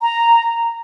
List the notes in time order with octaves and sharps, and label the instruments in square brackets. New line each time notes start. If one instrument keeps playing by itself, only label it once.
[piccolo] A#5